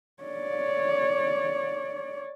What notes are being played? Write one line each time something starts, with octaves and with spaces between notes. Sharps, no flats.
C#5 D5